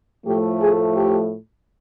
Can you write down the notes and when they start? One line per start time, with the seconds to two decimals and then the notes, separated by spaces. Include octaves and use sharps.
0.26 A2 F3 A3 G4
0.60 G#4
0.94 G4